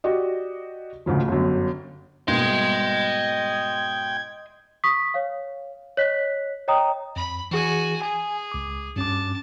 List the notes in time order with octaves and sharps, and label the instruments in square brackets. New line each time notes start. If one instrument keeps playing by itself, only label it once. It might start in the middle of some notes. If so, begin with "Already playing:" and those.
[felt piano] F#4 G4 D5 D#5
D2 G#2 C#3 F3
G1 F#2
[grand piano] G#2 B2 A#3 [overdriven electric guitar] D#5 C6 [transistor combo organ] G5 [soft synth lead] G#6
[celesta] C#6 D#6 B6
C#5 F5
C#5 D#5 F#6 B6
C#5 D#5 G5 A#5 D#6
[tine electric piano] F2 [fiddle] B5
[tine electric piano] E3 G#4 [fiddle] F#4 G#5
[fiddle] G#4 [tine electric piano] G#5
[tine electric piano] C#2 D6
[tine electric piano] G2 C#4 D6 [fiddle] A5